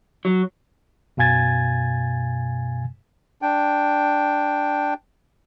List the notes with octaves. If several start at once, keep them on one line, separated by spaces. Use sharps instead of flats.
F#3
F#2 B2 F5 G#5 G#6 A6
D4 G5